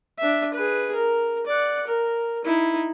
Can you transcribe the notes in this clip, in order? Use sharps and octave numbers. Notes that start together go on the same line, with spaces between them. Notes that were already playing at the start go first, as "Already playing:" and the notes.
D4 E5
G#4 B4
A#4
D5 F#5
A#4
D#4 E4